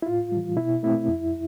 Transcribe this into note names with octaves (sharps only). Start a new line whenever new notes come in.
E4
A2 F4
G3
E3
B2 E4
A3 C4 E4
F2